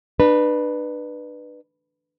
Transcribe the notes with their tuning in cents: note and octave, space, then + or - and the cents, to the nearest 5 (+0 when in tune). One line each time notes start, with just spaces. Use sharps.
D4 +35 B4 -10